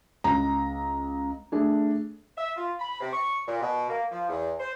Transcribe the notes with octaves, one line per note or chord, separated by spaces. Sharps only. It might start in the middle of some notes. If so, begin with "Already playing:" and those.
C#2 A#5
A3 D4 G#4
E5
F4
B5
C3
C#6
A#2
B2
A#3
F3
E2
C5